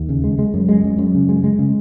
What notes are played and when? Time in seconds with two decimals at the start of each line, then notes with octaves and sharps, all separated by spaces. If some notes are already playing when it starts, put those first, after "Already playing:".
Already playing: D#2
0.09 C#3
0.24 G#3
0.39 G#3
0.54 F#2
0.69 G#3
0.84 F#2
0.98 F#2
1.15 C#3
1.29 G#3
1.44 G#3
1.59 C#3